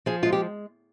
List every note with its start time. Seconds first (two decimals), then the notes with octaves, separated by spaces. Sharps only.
0.06 F3 G#4
0.23 G#3 F4
0.32 G4